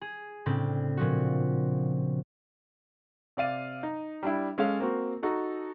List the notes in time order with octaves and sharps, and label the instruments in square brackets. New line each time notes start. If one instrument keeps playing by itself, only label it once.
[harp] G#4
A2 C#3 C4 D4
A#2 F3 F#4
[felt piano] C3 D5 F5 D#7
D#4
G3 D4 E4
G#3 C#4 A4 C#5 F5
A#3 C4 F#4
D#4 F#4 A4